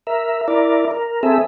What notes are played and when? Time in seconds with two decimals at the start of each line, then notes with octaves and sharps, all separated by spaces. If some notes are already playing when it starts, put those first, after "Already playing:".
0.07 A#4 E5
0.48 E4 A#4 D5
0.91 A#4
1.23 C4 G#4 A4 E5